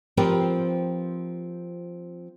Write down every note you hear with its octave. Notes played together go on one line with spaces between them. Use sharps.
F3 C4 F4 G4 A#4 B4